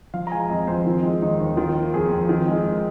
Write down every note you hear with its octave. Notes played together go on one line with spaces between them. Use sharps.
F3 F5
A#5
G#3 G#5
F2 D#5
F2 C5
D#3 F4
G#3
D#2 D#4
D#2
D#3 F4
A#3
F2 G#4
F2
D#3
G#3